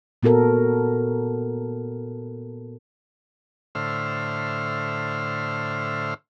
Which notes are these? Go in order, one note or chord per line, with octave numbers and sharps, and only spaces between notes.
A#2 B3 F#4 A4 A#4
A2 D3 C5 E5 F6